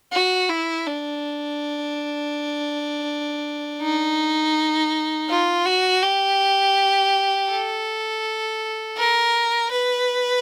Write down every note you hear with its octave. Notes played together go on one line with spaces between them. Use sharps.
F#4
E4
D4
D#4
F4
F#4
G4
A4
A#4
B4